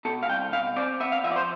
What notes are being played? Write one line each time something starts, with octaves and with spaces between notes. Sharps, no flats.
B2 A4
F5
C2 G5
B2 F5
C4 D5
B3 E5
F5
F3 E5
D5
C5